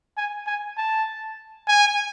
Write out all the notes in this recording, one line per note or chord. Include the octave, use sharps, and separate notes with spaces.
G#5
G#5
A5
G#5